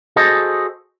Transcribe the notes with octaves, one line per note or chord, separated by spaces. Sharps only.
F#4 G#4 A4 C5 D#5